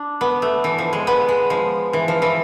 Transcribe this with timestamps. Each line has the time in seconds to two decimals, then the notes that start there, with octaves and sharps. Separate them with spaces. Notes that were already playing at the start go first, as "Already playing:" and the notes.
Already playing: D4
0.21 B3
0.42 A3
0.64 E3
0.78 F3
0.93 G#3
1.07 B3
1.29 G#3
1.50 F3
1.93 E3
2.08 F3
2.22 E3